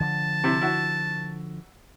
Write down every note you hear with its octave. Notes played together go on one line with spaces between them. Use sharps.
D3 F3 A5
C3 E4
E4 F#4